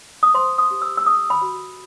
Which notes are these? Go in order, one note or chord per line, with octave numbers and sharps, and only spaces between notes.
D#6
C5 C6
D#6
G4
E6
E6
A4 D#6
B5
F#4